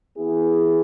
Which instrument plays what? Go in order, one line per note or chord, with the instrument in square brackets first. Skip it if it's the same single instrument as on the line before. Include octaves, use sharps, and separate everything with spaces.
[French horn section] E3 B3 E4 G#4